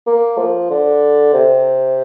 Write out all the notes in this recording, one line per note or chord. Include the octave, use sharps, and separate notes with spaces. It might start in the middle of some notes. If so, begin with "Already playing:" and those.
A#3
F3
D3
C3